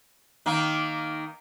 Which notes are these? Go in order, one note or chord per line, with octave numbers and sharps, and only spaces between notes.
D#3 A#3